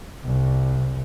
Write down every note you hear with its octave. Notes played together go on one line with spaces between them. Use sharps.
C2